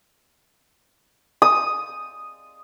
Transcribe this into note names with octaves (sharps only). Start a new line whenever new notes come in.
D#6